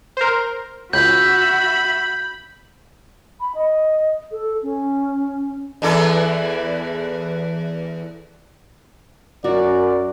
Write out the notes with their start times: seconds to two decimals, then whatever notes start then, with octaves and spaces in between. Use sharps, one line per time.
0.17 A#4 C5
0.93 C#2 F#4 E5 B5 G6
3.40 B5
3.55 D#5
4.31 A4
4.63 C#4
5.82 E2 E3 A4
9.44 F#2 F#4 A#4 D5